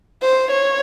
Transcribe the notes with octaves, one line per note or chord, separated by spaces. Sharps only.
C5
C#5